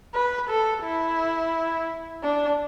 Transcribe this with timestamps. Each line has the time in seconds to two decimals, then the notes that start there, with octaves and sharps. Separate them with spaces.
0.14 B4
0.49 A4
0.83 E4
2.23 D4